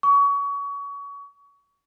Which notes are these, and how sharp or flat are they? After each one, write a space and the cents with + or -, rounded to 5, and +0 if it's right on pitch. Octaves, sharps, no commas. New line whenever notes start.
C#6 +30